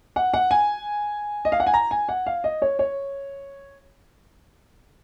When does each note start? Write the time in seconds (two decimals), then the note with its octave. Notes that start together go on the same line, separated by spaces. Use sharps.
0.16 F#5
0.34 F#5
0.51 G#5
1.45 D#5
1.52 F5
1.60 F#5
1.67 G#5
1.74 A#5
1.91 G#5
2.09 F#5
2.26 F5
2.44 D#5
2.62 C#5
2.79 C#5